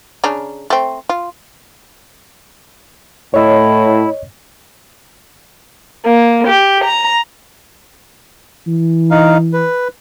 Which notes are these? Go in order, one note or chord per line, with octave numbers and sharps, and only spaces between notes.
C#3 D4 A#5
A3 C4
F4
A2 E4 C#5 D#5
A#3
G4
A#5
E3
D#4 F5
B4